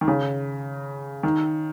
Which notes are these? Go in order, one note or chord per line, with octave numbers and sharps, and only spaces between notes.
D#3
C#3
D#3